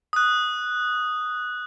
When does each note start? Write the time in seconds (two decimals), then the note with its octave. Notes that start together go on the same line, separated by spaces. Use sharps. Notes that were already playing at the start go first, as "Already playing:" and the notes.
0.13 D#6 F#6